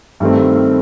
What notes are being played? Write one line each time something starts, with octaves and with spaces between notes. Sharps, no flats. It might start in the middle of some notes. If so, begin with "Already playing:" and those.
G2 D#3 A3 C4